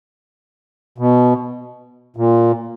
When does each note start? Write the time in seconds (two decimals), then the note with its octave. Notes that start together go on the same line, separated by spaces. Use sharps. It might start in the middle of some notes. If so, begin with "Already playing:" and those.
0.98 B2
2.16 A#2